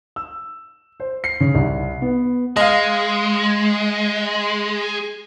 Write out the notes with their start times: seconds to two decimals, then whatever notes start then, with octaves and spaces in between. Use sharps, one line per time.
0.16 E6
1.00 C5
1.24 C7
1.40 C#3
1.55 C2
2.02 B3
2.57 G#3 D#5 F5